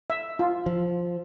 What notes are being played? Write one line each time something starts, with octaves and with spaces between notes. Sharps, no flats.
E5
F4
F3